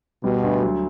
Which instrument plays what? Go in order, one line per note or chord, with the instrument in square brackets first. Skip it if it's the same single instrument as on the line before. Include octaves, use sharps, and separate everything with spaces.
[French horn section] B2 [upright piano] G3
[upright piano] D2
F#3